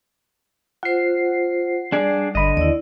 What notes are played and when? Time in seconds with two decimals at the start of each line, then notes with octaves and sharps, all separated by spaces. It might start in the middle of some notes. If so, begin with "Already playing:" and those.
0.83 F4 C5 F#5 C7
1.92 G3 D4 G#4 D5
2.35 G1 D3 D#5 B5
2.57 D#2 E4 D5